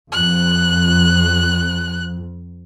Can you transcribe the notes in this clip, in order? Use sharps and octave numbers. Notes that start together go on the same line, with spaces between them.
F2 F#6